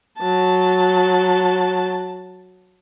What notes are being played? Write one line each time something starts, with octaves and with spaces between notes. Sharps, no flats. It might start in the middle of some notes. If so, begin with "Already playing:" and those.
F#3 A5